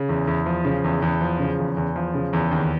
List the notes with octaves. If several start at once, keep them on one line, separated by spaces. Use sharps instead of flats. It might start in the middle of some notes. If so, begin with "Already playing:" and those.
Already playing: C#3
E2
E2
F3
C#3
E2
E2
F3
C#3
E2
E2
F3
C#3
E2
D#2